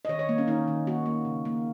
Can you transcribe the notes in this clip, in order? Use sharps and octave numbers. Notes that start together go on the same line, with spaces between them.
D#5
D#3 C#5
C#5
A#3
C#4
D#3 D#4
D#3
A#3 F#4
A#3
C#3
A#3